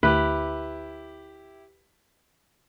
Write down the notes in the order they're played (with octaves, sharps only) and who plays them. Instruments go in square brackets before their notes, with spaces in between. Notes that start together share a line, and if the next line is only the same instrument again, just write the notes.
[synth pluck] D2 [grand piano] E4 G4 [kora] B4